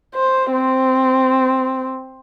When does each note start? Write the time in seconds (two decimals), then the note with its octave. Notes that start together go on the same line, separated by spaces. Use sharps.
0.15 C5
0.52 C4